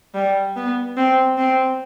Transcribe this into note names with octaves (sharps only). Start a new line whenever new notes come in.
G3
B3
C4
C4